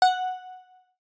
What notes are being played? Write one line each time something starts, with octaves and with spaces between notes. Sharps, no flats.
F#5